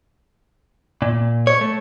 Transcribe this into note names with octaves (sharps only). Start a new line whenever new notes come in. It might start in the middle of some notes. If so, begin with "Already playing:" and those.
A#2
C#5
A3